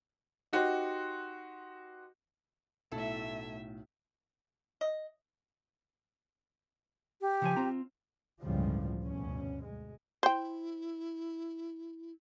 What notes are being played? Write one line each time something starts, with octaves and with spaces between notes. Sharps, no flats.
D#4 F#4 G4 C5
B1 A2 A3 E4 A4 E5
D#5
G4
C#3 F3 G#5
C4 F4 A#5
G1 C#2 A2 E3 F3 G3
F1 D2 G2 B2 C#4
G#3
E4 C5 G5